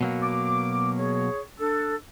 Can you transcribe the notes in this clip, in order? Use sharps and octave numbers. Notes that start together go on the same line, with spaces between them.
B2 F#3 A#3
D6
G#4 C#5
D4 A4